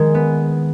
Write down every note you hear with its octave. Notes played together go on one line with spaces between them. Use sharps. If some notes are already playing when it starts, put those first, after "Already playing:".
Already playing: D#3 G#3
B3